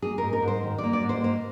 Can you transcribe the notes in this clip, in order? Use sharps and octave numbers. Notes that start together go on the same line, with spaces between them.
A#3 G#4
G#2 A#4
A#4
G#2
C5
D#3
D5
A#3
D5
G#2
C5
A#3 C5